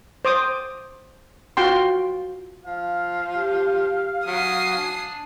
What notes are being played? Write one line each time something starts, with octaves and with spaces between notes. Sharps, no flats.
C5 D6 D#6
F4 F#4 G5 C6
F3 F5
G4
F#3 G#5 D#6 C7
D4